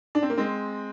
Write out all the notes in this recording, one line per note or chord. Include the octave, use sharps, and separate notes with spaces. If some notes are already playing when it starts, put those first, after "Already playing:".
D4
C4
A#3
G#3 C4